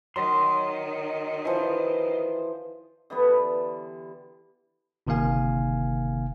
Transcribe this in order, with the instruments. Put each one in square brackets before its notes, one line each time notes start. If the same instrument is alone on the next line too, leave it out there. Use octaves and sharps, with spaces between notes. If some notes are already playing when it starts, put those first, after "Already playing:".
[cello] D#3 [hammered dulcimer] F#3 [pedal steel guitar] C6
[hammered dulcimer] E3 F3
D3 E3 G3 B3
[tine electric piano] G1 C3 D#3 A#3 F5 G#5